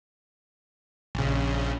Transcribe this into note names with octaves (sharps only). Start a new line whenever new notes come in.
A#1 C#3